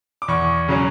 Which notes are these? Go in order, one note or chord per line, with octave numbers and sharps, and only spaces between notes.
D6
E2 C#6
C#3 F#3 C#4